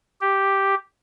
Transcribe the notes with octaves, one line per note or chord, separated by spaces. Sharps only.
G4